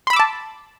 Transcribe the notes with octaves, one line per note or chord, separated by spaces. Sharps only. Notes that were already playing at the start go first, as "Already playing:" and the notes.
A5 B5 C6 D6 E6